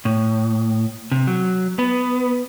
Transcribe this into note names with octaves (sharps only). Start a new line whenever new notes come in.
A2
C3
F#3
B3